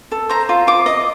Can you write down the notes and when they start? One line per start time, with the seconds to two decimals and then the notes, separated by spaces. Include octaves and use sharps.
0.12 A4
0.29 C5 A#5
0.49 F4
0.67 F4 D6
0.86 D#5